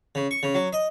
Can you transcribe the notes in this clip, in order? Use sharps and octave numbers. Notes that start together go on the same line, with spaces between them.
C#3
C#6
C#3
F#3
D#5